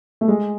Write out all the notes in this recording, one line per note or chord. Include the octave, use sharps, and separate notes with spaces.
A3
G#3